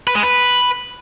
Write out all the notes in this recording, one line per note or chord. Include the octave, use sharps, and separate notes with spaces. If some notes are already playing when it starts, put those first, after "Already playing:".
B4
G#3
B4